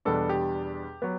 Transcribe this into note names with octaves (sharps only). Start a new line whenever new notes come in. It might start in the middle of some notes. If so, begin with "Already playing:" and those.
E2 B2 G3 B3 D4 A4
G4
F#3 B3